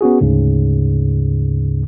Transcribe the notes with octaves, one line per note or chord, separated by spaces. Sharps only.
B3 C#4 F#4 G#4
D2 G#2 C#3